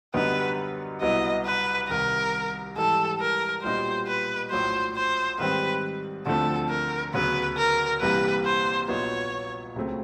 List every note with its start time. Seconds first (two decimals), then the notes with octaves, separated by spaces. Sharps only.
0.14 F#2 D3 G3 B3 D#4 B4
1.01 C2 B2 F#3 B3 E4 D#5
1.46 B4
1.89 C2 C3 D#3 A#4
2.76 G#2 E3 G3 A4
3.21 A#4
3.63 B1 A#2 G3 B3 D#4 C5
4.08 B4
4.51 A#1 A2 F#3 C5
4.96 C5
5.38 G#2 D#3 G3 C4 B4
6.26 D2 D3 F3 A3 C4 A4
6.70 A#4
7.14 D2 C#3 F#3 B3 B4
7.58 A#4
8.01 C2 C3 E3 G3 A#3 B4
8.45 C5
8.88 A#1 A#2 F#3 B3 D#4 C#5
9.76 C#2 C#3 F#3 A3 C4